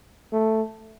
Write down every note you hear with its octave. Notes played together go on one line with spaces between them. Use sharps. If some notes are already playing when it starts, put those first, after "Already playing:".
A3